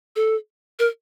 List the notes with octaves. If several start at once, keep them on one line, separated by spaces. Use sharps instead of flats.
A4
A#4